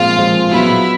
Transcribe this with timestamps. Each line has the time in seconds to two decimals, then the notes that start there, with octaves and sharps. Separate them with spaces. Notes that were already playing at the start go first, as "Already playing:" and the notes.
Already playing: A#2 F3 G#3 C4 F4
0.19 A#2 F3 G#3 C4
0.51 B2 F#3 B3 E4